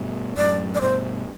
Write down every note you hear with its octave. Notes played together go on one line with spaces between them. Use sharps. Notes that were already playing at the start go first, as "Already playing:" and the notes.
Already playing: G2 B2
F#2 A2 D5
D5
G2 B2 C5